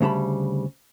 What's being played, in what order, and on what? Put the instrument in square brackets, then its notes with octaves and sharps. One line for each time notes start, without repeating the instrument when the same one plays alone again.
[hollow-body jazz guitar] D2 C#3 G3 A5 B5